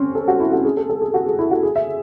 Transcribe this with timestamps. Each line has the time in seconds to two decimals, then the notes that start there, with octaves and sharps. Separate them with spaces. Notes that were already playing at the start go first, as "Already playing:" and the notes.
Already playing: C4 C#4
0.15 A4
0.28 F#4
0.40 E4
0.52 F#4
0.65 G#4
0.77 A4
0.90 A4
1.02 G#4
1.14 F#4
1.27 G#4
1.39 E4
1.51 F#4
1.63 G#4
1.76 E5